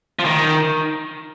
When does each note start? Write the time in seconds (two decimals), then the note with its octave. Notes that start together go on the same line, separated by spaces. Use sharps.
0.19 F3
0.25 D#3